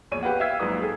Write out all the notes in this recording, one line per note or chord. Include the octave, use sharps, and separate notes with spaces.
E1 A#1 C#5 D#7
G4 B4 F5 F#5
E5 F5 G5 E6 G#6 B6
A#1 G#2 F#3 B4 D#6
G#4 A4